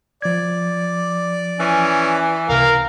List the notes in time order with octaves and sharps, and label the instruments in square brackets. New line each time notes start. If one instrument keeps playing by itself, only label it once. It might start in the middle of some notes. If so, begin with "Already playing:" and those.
[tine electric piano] F3 G#6 [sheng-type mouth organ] D5
[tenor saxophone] E3 [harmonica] C#4
[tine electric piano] C#2 C3 [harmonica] A#4 F5 [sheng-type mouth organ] A#5